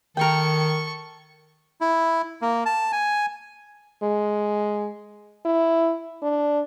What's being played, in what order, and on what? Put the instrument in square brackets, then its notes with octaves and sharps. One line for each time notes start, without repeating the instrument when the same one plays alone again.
[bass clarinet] D#3 [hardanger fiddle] A4 C#6 [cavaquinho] A#4 G5
[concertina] E4
A#3
A5
G#5
[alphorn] G#3
E4
D4